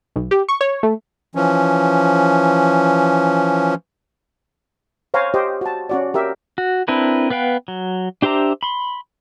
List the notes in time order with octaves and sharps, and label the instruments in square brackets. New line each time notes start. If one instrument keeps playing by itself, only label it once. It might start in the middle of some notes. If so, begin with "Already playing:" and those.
[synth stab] B1
G4
C#6
C#5
A3
[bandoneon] E3 F3 C#4
[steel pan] C5 C#5 F5 G#5 A#5
G4 C5 D#5
F#4 A5
C#4 F#4 D5
G4 A#4 E5
[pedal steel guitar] F#4
C4 D4 E4 A#4 B4
B3 B4 F5 G5
F#3
D4 G4 C5 E5 A#5
B5 C6